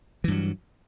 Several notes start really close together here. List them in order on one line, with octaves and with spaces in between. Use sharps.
E3 G2 F#3